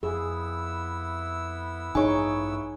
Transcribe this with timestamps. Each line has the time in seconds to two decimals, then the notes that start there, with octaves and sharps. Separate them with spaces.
0.03 F2 B3 E4 G#4 E6
1.95 A1 G2 F3 D#4 G#4 C#5 G#5 C#6